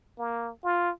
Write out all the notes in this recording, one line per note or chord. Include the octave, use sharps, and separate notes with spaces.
A#3
F4